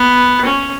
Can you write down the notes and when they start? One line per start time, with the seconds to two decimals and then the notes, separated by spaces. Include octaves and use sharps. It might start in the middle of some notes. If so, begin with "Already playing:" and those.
Already playing: B3
0.45 C#4